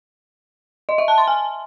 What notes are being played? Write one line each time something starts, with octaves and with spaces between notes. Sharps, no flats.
D#5
E5
A5
C6
G#5